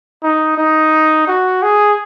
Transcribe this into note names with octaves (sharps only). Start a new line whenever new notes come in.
D#4
D#4
F#4
G#4